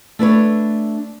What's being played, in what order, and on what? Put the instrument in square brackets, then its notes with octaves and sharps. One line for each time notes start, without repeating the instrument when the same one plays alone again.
[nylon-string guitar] A3 D4 B4 C#5